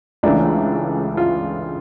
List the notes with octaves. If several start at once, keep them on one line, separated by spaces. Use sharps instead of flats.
C#2 C#3 E3 A3 D4
F4